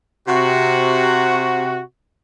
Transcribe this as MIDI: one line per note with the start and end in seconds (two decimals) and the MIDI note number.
0.28 1.80 48
0.28 1.80 66